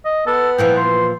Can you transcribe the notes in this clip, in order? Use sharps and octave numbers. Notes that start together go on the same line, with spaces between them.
D#5
B3 A4
A#2 E3 F3 G5
C6